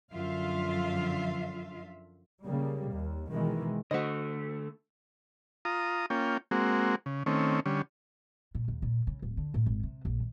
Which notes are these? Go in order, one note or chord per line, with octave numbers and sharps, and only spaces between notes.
F#2 D3 F3 F4 E5 F5
C#3 G3 A#3
D#2
B2 D#3 E3 G#3
D3 A3 F#4 C5 D#5
F4 A#5 D#6
A#3 C#4 F4 G5
G#3 A#3 C4 F#4
C#3
D#3 A3 C4 C#4
D3 G3 C#4
A#2
D#2
A#2
C#3
D1
D3
A2
G#1
C3
A#1
D#3